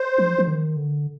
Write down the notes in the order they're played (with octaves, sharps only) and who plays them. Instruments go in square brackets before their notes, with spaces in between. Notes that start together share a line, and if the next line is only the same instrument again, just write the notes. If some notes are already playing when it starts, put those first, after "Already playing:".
Already playing: [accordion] C5
[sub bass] F3
F3
D#3
D3